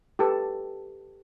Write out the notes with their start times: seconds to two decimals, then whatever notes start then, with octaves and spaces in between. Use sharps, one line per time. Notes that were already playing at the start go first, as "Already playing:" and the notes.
0.19 G4 A4 B4